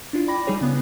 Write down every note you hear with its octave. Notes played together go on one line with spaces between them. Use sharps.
D4 E4 F4
D5 G5 B5 D6 A#6
G3 D#4 G#4 C#5
C#3 B3